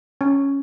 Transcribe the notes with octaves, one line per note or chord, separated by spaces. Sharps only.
C#4